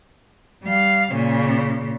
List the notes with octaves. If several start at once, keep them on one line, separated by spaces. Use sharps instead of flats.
G3 F5
A#2 C#3